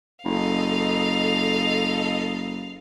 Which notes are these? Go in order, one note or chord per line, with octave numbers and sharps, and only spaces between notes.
F#1 A4 D#5 F5